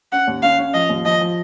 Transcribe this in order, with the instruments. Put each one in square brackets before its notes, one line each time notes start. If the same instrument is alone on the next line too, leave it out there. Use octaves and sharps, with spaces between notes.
[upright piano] C#4 [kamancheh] F#5
[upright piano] D#2
[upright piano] C#4 [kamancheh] F5
[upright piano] C#4
[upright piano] F3 [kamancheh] D#5
[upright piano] D#2
[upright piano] F3 [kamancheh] D#5
[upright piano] F3